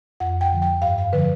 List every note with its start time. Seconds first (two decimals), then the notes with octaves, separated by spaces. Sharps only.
0.20 F2 F#5
0.41 G5
0.52 D3 F3
0.62 G5
0.82 G2 F5
0.98 F5
1.13 D3 F3 B4